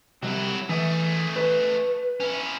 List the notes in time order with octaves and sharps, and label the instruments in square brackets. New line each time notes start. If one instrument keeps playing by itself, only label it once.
[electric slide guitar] C3 G3 [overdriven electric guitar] F#3 E4
[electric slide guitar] E3 [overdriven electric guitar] A3 G#4
[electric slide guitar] B4
[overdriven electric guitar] C#4 E4